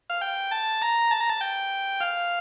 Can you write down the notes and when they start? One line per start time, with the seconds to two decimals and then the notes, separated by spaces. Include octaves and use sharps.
0.10 F5
0.21 G5
0.51 A5
0.82 A#5
1.11 A5
1.20 A#5
1.30 A5
1.41 G5
2.01 F5